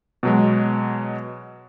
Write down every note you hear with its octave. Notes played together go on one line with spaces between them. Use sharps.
B2 F#3 G#3